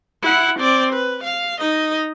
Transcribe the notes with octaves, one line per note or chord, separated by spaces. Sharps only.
E4 F#5
C4 D5
B4
F5
D#4 D#5